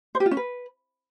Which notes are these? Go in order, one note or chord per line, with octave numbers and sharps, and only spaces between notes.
C5
G4
F4
C#4
B4